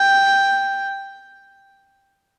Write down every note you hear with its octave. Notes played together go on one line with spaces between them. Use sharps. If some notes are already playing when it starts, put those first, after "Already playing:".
Already playing: G5